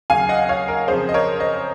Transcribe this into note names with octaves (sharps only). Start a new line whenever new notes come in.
D#2 C#3 F#3 F5 G#5
D#5 F#5
C#5 F5
A#4
F2 C#3 F3 G#4 C5
D#5
A#4 C#5
C5 D#5